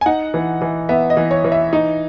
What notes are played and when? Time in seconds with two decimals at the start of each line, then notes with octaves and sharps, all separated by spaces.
0.01 G#5
0.06 D#4 F#5
0.34 E3
0.62 E3
0.89 B3 E5
1.10 D#5
1.17 E3
1.31 C#5
1.44 E3
1.52 E5
1.73 D#4